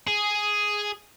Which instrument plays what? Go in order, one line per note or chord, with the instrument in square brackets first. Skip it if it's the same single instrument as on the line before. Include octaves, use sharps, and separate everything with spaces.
[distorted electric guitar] G#4